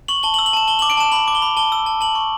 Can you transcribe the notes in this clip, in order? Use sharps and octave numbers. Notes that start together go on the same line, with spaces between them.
C#6 F#7
A5 G7
F#7
E6
F#7
A5 E7
A5 G7
F#7
D6
D7
A5 E7
B5 F#7
D6
G7
B5
A5 G7
E6
A5
A5 F#7
C#6